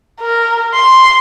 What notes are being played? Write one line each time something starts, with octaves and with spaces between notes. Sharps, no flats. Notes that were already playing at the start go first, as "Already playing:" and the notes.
A#4
C6